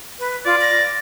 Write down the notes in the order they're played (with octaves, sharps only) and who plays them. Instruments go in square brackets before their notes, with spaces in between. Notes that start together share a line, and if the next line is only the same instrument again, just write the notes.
[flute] B4
[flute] F4 [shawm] D5
[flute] A#6